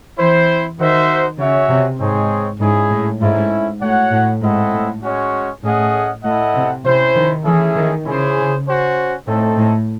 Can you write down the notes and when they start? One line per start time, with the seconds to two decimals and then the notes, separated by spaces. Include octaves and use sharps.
0.18 E3 C4 E4 C5
0.78 D#3 D#4 F#4 C5 E5
1.38 C#3 C#4 F#4 C#5 E5
1.69 C3
2.00 G#2 G#3 C4 D#4 G#4 C#5
2.60 G#2 C#4 E4 G#4
2.91 A2
3.20 G#2 A3 C#4 E4 A4
3.81 A2 F#4 C#5 F#5
4.12 A2
4.41 G#2 C4 E4 A4 D#5 F#5
4.73 A2
5.03 G#3 C#4 F#4 C#5
5.63 A2 A3 C#4 G#4 D#5 F#5
6.24 A2 E4 A4 D#5 F#5
6.55 C3
6.84 C3 C#4 E4 C5
7.15 D#3
7.45 E3 A3 C#4 E4 G#4
7.76 D#3
8.05 C#3 C#4 E4 G#4 C5
8.66 C#4 F#4 C5
9.26 A2 A3 C4 D#4 A4
9.57 A2